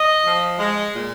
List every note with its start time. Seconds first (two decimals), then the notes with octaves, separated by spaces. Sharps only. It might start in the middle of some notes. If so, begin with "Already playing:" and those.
Already playing: D#5
0.24 F3
0.58 G#3
0.93 A#2